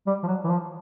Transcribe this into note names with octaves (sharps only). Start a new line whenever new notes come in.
G3
F3
F#3
E3
F3